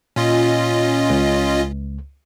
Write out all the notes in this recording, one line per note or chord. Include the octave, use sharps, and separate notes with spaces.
A#2 C#4 F4 D#5
C#2